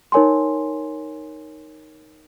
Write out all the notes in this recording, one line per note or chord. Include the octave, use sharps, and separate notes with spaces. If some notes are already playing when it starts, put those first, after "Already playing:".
D#4 A#4 C#5 G#5 C6